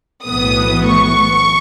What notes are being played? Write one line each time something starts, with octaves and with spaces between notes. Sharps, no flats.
B1 A2 E3 B3 D#6
C#6